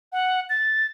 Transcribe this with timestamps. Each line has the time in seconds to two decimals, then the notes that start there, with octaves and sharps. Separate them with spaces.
0.12 F#5
0.50 A6